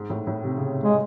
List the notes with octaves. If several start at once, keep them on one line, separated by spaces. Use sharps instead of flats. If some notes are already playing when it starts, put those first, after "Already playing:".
Already playing: G#2
A2
A2
C3
C#3
C#3 G#3